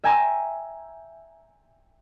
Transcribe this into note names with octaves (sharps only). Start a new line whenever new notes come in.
E5 G5 G#5 A#5 C6 E6